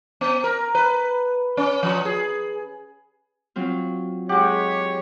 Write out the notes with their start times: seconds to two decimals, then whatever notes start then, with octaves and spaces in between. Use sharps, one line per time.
0.21 B3
0.44 A#4
0.75 B4
1.57 C#4
1.83 F3
2.05 G#4
3.56 F#3 C4 F4
4.29 G#3 G4 C#5 F#5